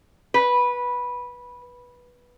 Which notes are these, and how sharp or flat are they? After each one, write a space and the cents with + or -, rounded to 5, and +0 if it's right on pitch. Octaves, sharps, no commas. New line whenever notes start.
B4 -10